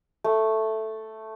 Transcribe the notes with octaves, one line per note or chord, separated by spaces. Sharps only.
A3